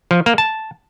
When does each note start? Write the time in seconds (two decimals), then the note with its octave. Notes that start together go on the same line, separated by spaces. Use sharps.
0.11 F3
0.26 A#3
0.38 A5